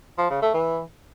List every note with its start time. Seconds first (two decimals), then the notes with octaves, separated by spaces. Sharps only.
0.18 F3
0.30 C#3
0.42 A3
0.54 E3